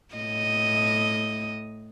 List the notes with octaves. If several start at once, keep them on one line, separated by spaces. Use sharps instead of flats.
A2 D#5